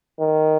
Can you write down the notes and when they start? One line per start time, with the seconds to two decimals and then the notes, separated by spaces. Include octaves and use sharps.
0.20 D#3